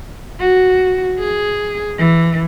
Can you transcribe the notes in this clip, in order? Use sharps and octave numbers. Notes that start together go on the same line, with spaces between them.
F#4
G#4
E3